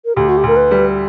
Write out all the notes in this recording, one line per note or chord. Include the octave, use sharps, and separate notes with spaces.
A#4
D2 G4
F#4
G4
D2 A#4
B4
G3